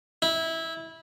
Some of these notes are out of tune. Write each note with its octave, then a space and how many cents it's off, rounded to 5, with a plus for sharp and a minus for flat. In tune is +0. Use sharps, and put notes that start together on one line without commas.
E4 -15